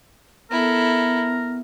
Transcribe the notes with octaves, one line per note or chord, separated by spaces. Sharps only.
B3 E4 A4 A#4